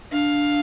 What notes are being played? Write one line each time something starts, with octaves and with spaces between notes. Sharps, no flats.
D4 F5